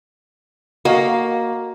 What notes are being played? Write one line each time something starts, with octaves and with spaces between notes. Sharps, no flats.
A#3 F#4 D#5 F5